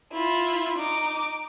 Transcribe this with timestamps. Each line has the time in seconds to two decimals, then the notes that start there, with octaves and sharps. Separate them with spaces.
0.13 E4 F4
0.78 D#4 D6